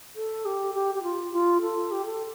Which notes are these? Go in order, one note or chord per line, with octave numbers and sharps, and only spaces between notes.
A4
G4
G4
G4
F4
F4
A4
G4
A4